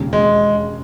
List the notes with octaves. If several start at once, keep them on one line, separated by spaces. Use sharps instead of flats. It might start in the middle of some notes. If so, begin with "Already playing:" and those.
Already playing: E1 D#2 C#3
G#3